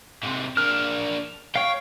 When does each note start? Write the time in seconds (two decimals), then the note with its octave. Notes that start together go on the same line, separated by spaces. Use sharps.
0.23 G#2 C3
0.57 A#3 D4 F6
1.56 C#5 F5 G5